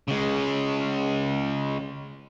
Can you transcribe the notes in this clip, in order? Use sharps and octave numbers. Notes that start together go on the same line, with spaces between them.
C#3 G#3